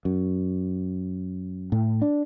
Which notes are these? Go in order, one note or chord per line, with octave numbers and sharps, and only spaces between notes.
F#2
A2
D4